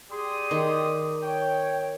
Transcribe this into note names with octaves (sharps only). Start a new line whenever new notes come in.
G4 G#4 D5 C6 D#6
D#3
C#5 G5